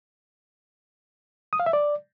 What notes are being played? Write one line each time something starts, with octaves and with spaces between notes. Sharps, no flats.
D#6
F5
E5
D5